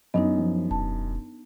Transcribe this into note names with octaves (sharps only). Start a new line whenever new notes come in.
F#2 B3 D4 D#4 D#5
F3
E1 A5